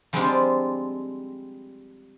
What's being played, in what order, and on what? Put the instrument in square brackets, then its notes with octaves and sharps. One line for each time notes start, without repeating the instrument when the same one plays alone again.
[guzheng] F3 G3 G#3 C4 D4 F4